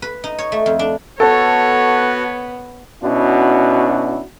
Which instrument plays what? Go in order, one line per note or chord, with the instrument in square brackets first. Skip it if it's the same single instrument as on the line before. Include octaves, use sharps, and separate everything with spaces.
[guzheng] B4
D#4
C#5
A3
F2
D4
[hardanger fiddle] B3 [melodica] F#4 [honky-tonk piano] A4 [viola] C#5
[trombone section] B2 C#4 D4 E4 F#4